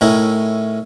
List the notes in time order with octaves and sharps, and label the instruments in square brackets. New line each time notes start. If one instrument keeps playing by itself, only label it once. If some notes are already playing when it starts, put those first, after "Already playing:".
[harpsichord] A2 C#4 D#4 E4 A#4